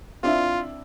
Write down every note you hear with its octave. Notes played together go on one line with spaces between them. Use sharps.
C4 D4 E4 F4